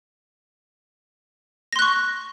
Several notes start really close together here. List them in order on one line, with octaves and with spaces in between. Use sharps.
A#6 C6 F#6 C#6